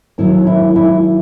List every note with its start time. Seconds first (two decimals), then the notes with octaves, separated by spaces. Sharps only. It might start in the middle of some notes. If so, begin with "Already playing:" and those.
0.18 D#2 D#3 F#3 E4
0.47 E4
0.76 E4